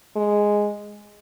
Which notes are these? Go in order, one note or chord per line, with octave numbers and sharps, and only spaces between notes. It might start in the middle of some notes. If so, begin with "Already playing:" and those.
G#3